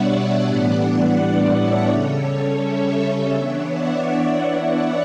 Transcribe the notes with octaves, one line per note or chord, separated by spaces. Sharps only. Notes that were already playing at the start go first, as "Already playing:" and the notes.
Already playing: B2 G3 B3 D4 C#5 D5 E5 F#5
D5 F#5
A2 E3 G3 B3 D4 D5 F#5
C#5 E5
C#3 G3 C#4 A4 C#5
A4 C#5
C#5 E5
E3 B3 D4
D5 F#5
D5 F#5
D5 F#5